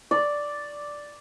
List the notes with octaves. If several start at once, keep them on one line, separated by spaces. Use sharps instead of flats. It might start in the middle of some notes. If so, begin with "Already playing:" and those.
D5